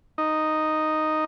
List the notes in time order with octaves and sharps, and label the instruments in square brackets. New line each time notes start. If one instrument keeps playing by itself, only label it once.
[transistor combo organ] D#4